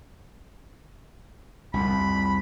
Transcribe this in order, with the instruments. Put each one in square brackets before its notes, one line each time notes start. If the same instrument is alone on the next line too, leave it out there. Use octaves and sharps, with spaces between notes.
[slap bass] C2 F2 [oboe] B5